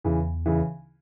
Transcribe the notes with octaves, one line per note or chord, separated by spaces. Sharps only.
E2 C#3 E3
C#3 E3